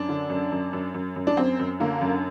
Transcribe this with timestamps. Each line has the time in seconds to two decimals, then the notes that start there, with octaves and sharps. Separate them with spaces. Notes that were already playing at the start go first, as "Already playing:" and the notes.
Already playing: F#2 D4
0.09 D3
0.30 F#2
0.52 F#2
0.73 F#2
0.94 F#2
1.16 F#2
1.27 D4
1.37 F#2 C4
1.59 F#2
1.80 D3 A#3
2.01 F#2